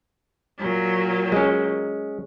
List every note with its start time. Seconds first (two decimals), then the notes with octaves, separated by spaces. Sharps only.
0.59 A#2 F#3
1.32 G#3 C#4